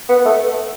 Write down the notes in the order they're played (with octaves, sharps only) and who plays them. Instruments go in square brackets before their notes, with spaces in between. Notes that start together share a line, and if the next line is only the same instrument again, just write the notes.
[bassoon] B3
A3